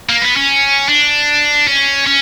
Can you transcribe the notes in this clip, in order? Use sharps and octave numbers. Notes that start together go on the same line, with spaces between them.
A#3
B3
C#4
D4
C#4
C#4